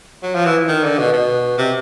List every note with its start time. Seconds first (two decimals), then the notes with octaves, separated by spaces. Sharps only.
0.23 F#3
0.35 F3
0.46 E3
0.68 D#3
0.84 D3
0.99 B2
1.13 B2
1.58 C3